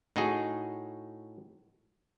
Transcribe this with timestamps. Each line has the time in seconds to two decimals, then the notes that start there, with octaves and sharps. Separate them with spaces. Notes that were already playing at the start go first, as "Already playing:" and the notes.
0.16 A2 D#4 F#4 G#4